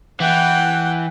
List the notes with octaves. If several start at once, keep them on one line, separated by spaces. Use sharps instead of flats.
E3 F#5 G5